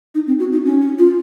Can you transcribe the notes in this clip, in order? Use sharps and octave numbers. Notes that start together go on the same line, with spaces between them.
D#4
C4
F#4
D#4
C#4
C#4
F4